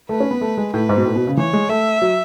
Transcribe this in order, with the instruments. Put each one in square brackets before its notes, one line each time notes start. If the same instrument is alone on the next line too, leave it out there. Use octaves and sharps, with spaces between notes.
[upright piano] A3 [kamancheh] B4
[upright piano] C#4
B3
A3
G#3
[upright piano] A2 [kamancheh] B4
[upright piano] G#2
B2
A2
B2
C#3
[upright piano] E3 [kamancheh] C#5
[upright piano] G#3
[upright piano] A3 [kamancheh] E5
[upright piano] F#3